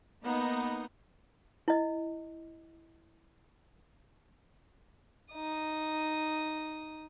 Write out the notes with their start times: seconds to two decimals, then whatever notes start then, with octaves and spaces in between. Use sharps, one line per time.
0.23 A#3 B3 D#4
1.68 E4 D#5
5.34 D#4 D#6